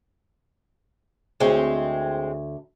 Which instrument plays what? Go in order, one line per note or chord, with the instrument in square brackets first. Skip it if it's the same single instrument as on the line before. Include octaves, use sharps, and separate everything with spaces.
[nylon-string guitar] D2 C#5 [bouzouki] G#3 C4